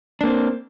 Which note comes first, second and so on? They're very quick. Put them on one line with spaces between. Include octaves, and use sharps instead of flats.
D4 A#3 C4